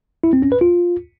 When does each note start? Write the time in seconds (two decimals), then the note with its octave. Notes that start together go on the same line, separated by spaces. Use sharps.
0.24 E4
0.33 C4
0.42 C#4
0.52 B4
0.61 F4